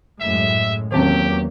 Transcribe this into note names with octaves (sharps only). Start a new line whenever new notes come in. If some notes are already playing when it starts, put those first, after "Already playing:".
F#2 A2 G#3 E5
E2 D#3 F#3 A#3 C4 C#4 G4